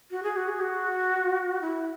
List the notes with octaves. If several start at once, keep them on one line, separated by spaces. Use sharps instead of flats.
F#4
G#4
F#4
G#4
F#4
E4